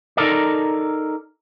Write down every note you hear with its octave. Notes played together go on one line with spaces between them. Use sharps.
D#4 A4 A#4 D5